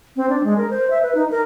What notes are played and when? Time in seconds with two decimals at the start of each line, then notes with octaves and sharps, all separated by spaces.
0.16 C4
0.29 D4
0.44 G#3
0.57 A#4
0.71 C5
0.90 E5
1.03 B4
1.15 D#4
1.31 A#4